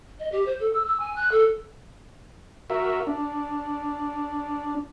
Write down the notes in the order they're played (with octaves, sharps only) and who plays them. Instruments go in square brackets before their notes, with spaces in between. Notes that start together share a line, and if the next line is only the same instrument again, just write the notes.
[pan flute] D#5
G4
C5
A4
E6
E6
G#5
F#6
A4
[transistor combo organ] F#4 A#4 E5
D4